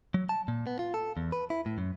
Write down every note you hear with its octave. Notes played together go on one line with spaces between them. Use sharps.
F#3
A5
A#2
B3
F4
A4
E2
B4
E4
A2
F#2